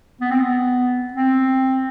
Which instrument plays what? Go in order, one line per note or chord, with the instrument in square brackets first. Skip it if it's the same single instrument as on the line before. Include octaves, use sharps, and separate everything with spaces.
[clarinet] B3
C4
B3
C4